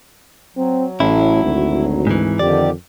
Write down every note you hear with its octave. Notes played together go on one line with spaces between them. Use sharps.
F#3 C4
A1 A2 E4
G#1 D2
G#2 E3
F2 D3 D#3 G4 D5